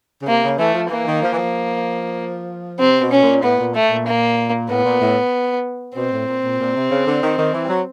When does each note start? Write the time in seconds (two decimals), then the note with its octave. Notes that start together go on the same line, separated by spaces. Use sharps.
0.22 C#3
0.27 C3 A#3
0.43 C#3
0.58 E3 A3
0.74 F3
0.90 E3 A#3
1.06 D#3
1.22 F3
1.33 E3
1.38 F3
2.79 C3 C4
3.01 B2
3.11 C#4
3.22 A#2
3.43 A2 B3
3.59 A#2
3.74 A3
3.90 A#2
4.06 A#3
4.69 A2 B3
4.84 A#2
5.01 A2
5.95 B2 C4
6.12 A2
6.28 A#2
6.42 A#2
6.59 A#2
6.75 C3
6.91 C#3
7.07 D3
7.22 D#3
7.37 D#3
7.53 E3
7.64 G3
7.69 F#3